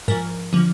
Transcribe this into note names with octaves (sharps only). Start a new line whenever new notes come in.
G#2 F3 A#4
D3 F3